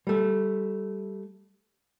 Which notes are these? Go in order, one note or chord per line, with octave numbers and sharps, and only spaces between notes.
G3 A3